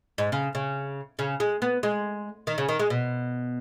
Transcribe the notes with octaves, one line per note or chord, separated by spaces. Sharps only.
G#2
C#3
C#3
C#3
G#3
B3
G#3
D#3
C#3
D#3
G#3
B2